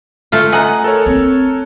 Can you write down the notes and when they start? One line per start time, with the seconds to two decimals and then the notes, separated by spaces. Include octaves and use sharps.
0.32 A3 F4
0.52 D#5 F#5 G#5 A#5 F#6
0.84 A4 A#4 C#5
1.06 C4